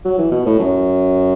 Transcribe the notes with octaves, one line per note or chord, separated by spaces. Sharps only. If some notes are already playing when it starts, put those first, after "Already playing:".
F#3
E3
B2
A2
F#2